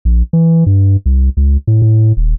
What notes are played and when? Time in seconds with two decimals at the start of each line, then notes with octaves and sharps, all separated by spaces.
0.05 A#1
0.33 E3
0.66 G2
1.06 C2
1.37 C#2
1.67 A2
1.82 A2
2.17 D#1